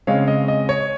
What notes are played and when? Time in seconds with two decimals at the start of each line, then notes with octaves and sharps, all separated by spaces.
0.07 C#3 G#3 C4 C#5 F5
0.28 D#5
0.48 D#5
0.69 C#5